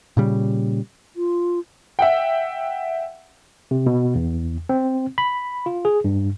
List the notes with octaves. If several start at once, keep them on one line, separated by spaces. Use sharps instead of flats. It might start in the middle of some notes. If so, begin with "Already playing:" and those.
A#2 C#3 G3
F4
E5 F#5 G5
C3
B2
E2
C4
B5
F4
G#4
G2